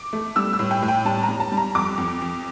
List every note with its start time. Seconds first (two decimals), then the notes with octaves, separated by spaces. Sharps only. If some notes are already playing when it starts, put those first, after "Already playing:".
Already playing: D6
0.13 A3
0.36 G3 E6
0.53 E6
0.59 A2
0.71 G5
0.82 A2
0.88 G5
1.05 G3 A5
1.23 A#5
1.29 G3
1.40 A5
1.52 G3
1.57 A#5
1.75 F2 D6
1.98 F2
2.22 F2